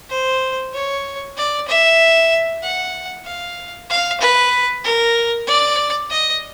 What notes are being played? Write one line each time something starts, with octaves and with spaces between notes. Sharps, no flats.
C5
C#5
D5
E5
F#5
F5
F5
B4
A#4
D5
D#5